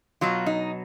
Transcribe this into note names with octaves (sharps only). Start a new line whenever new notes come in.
B2 F#3 F4
D#4